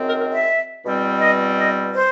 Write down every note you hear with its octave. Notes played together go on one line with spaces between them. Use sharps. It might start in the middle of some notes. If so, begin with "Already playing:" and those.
Already playing: F#2 D#3 G#3 C4
A#4
A#4
E5
E2 B2 G3 C4
D#5
D#5
C5